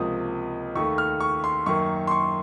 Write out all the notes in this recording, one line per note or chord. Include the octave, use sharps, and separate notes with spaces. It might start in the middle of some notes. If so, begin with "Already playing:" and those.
Already playing: C#2 C3 F3 A#3 D#6
D#2 D#3 A3 C#6
F6
C#6
C6
F#2 D#3 A#3 C#6
C6
C#6